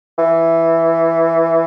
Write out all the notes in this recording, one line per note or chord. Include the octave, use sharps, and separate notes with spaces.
E3